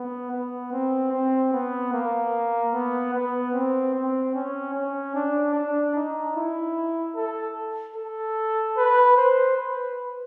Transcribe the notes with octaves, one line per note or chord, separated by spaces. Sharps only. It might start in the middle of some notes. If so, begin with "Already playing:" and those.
Already playing: B3
B3
C4
C4
B3
A#3
B3
B3
C4
C4
C#4
C#4
D4
D4
D#4
E4
A4
A4
B4
C5
B4